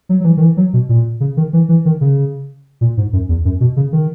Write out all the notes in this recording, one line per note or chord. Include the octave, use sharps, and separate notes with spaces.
F#3
F#3
E3
D#3
E3
F#3
B2
A#2
C#3
D#3
E3
E3
D#3
C#3
A#2
G#2
F#2
E2
F#2
B2
C#3
D#3